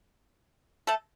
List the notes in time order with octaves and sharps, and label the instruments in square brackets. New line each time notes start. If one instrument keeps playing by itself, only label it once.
[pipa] A3 A4